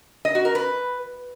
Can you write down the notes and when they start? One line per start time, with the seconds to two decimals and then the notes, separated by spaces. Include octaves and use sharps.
0.25 D#5
0.35 F#4
0.45 A#4
0.55 B4